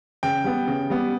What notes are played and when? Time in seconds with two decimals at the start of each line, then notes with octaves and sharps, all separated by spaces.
0.23 C#3 G5
0.44 G3 B3
0.68 C#3
0.90 G3 B3